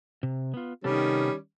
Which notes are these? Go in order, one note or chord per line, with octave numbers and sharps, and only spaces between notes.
C3
B3 F4
C3 D#3 G3 B3 C#4 A4